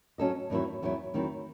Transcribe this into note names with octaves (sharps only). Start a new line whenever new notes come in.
F#3 C#4 F#4 A4 D#5
E2 D#3 F#3 C4 E4
E2 D#3 F#3 C4 E4
E2 D#3 F#3 C4 E4